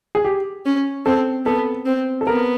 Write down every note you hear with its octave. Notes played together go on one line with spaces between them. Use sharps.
G#4
G4
C#4
C4 A4
B3 A4
C4
A4
B3 A#4